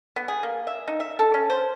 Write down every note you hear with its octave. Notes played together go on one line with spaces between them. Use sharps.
B3
G#4
A#3
E5
D#4
E5
A4
C#4
C5